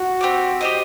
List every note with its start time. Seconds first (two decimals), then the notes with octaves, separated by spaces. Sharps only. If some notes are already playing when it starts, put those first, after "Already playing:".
Already playing: F#4
0.21 C4 G4 D5
0.61 G4 C5 D#5